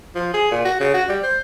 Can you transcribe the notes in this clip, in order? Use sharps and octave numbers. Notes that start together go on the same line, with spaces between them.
F3
G#4
A#2
F#4
C#3
F#4
G3
C5